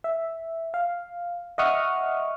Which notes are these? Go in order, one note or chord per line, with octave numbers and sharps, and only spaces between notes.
E5
F5
D#5 E5 F#5 C#6 D#6 F6